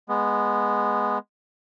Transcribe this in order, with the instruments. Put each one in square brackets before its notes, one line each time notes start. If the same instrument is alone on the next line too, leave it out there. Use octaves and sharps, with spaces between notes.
[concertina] G#3 B3